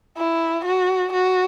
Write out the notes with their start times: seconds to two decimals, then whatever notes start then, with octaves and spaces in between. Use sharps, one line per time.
0.18 E4
0.65 F#4
1.13 F#4